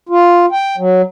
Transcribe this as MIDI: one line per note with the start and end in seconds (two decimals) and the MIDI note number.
0.09 0.46 65
0.52 0.76 79
0.78 1.02 54